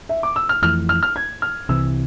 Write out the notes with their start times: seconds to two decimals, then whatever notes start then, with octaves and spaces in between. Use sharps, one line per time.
0.09 E5
0.23 D6
0.36 E6
0.49 F6
0.62 F2 E3 A3 F6
0.89 F6
1.03 F6
1.16 G#6
1.42 F6
1.69 C2 C3 E3 E6